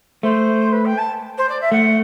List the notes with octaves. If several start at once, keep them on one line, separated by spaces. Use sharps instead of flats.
A3 C5
B4
G5
A5
C5
D5
E5
A3 F#5